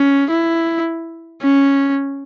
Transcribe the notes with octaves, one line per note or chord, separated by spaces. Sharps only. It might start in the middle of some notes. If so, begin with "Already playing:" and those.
Already playing: C#4
E4
C#4